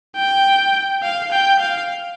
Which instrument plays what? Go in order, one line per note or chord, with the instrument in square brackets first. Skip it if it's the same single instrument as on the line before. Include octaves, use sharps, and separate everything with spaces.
[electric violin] G5
F5
G5
F5